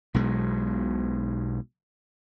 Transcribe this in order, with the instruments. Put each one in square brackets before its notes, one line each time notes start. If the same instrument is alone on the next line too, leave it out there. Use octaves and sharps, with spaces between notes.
[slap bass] B1 B2 G#3